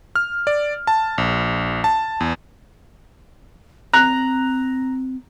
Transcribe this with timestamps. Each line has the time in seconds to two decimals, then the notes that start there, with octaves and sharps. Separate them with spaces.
0.15 F6
0.47 D5
0.87 A5
1.18 A#1
1.84 A5
2.20 E2
3.93 C4 A#5 F#6